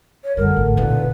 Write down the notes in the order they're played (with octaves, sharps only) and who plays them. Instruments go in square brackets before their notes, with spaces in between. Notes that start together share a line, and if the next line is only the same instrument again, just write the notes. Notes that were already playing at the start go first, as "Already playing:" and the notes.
[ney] C#5
[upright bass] F#2 G3 [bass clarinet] D3 [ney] A#4
[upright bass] A1
[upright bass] E1 A#2 [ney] B4